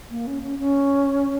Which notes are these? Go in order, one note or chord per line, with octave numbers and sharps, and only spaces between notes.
A#3
C#4
C#4
C#4